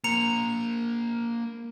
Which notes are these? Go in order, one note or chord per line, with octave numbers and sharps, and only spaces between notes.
A#3 C5 A#5 C#7 F7